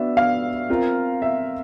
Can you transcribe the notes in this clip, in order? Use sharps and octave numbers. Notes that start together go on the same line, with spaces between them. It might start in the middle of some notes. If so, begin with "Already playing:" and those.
Already playing: B3 D4 F#4 E5
F5
C4 F4 A#4
E5